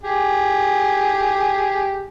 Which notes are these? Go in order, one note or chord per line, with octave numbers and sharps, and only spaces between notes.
G4 G#4